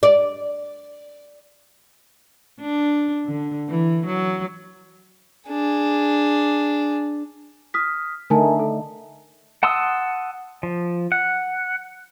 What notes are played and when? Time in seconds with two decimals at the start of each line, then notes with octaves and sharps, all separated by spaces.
0.03 D5
2.60 D4
3.26 D3
3.69 E3
4.06 F#3
5.48 D4 G#4
7.74 D#6 F6 B6
8.30 D3 A3 D#4 A#4 G#5 A5
8.59 A4
9.63 F#5 A5 C6 D#6 E6
10.63 F3
11.12 F#5